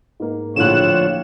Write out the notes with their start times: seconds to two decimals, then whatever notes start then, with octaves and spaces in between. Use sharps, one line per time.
0.20 G#2 A#3
0.56 A#1 A2 D3 F3 F4 C#5 F#6 E7